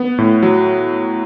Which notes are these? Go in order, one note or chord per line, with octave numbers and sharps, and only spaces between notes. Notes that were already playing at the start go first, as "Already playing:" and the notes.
Already playing: B3
A2
F#3